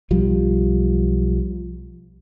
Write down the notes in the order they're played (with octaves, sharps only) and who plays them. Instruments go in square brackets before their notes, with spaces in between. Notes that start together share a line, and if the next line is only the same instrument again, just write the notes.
[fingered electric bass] B1 F3 G3